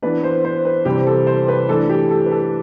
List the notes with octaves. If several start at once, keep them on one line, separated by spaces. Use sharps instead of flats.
E3 B3 D4 B4
C5
C5
B4
C3 E3 G3 C4 G4
A4
C5
B4
E3 A3 D4 A4
G4
A4
B4
A4